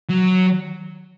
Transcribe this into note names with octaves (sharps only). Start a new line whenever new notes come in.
F#3